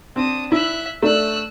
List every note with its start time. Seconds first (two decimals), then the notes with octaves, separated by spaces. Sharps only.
0.16 C4 D4 D#6
0.52 E4 E5 F#6
1.03 A3 D4 E6 F#6